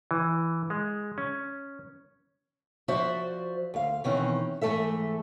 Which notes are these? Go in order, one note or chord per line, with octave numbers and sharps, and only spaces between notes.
E3
G#3
C#4
F3 F#4 C5 D5 E5
D2 F5
B2 D#3 E3 C4 C#4
G#2 E3 A3 A4 E5